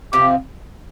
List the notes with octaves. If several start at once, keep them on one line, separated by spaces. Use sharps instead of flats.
C3 F3 C4 F4 G4